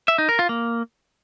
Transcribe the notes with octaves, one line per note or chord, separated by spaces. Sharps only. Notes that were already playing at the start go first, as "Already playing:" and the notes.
E5
D#4
A#4
F4
A#3